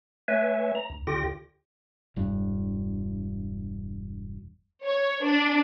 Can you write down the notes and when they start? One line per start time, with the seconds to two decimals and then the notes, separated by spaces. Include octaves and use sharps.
0.28 A3 B4 C#5 E5 G#5
0.75 A#5
0.90 D2
1.07 D2 D3 F4 G4 G5 A#6
2.16 E1 G2
4.85 C#5
5.24 D4